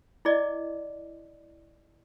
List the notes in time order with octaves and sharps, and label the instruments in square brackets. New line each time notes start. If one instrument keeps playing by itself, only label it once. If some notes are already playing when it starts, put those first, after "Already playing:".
[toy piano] E4 G#4 D5 D#5